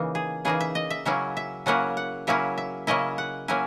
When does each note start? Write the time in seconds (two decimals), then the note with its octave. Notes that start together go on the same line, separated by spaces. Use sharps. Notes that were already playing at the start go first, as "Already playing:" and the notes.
Already playing: C#3 E3 A#3 D#4
0.15 G#4
0.45 C#3 E3 A#3 D#4 G#4
0.60 E5
0.75 D#5
0.90 E5
1.05 C#3 F#3 A#3 C#4 E4 E5
1.37 E5
1.66 C#3 F#3 A#3 C#4 E4 F#5
1.97 F#5
2.27 C#3 F#3 A#3 C#4 E4 E5
2.58 E5
2.87 C#3 F#3 A#3 C#4 E4 D#5
3.18 F#5
3.48 F#3 A#3 C#4 E4 G#5